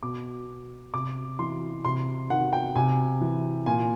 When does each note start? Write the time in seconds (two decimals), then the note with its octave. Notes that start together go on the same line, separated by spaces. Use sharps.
0.03 B2 D6
0.93 C3 D6
1.39 E3 C6
1.85 C3 C6
2.30 D#3 F#5
2.53 G5
2.76 C3 G#5
3.21 E3
3.66 A#2 G#5